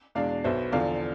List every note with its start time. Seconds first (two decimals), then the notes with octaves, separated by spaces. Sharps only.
0.15 E2 B2 G#3 D4 D5 F5
0.44 B1 B2 B3 C5 E5
0.72 E2 D3 F3 D5 F5